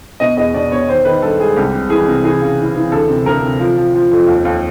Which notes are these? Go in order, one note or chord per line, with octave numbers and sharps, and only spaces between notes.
B2 D#5
E2 D#5
B2 D5
B2 C#5
D#3 C5
D#3 B4
G2 A4
G#3 G#4
C2 G4
C3
E3 G#4
C3
E3 G#4
C#3
E3
E3
D2 A4
C3
D2 A#4
C3
F3
F3
F3
F2
D#2
D#2